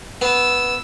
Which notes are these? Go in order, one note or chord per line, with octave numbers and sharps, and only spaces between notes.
B3 E6